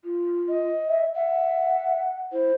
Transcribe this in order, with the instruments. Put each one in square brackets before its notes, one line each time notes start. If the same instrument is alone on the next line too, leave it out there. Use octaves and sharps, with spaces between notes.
[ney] F4
[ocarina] D#5
[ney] E5
[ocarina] E5 [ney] F#5
[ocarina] E4 [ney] C5